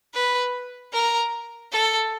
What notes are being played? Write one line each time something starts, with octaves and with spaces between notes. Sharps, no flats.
B4
A#4
A4